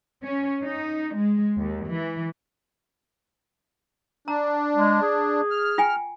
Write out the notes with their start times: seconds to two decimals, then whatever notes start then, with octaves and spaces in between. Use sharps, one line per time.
0.23 C#4
0.63 D#4
1.16 G#3
1.59 D#2
1.89 E3
4.28 D4 A#5
4.76 G#3
5.02 G#4
5.51 F6
5.78 F4 G5 G#5